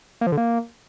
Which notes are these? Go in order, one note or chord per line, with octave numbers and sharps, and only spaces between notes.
A#3
F3
D3
A#3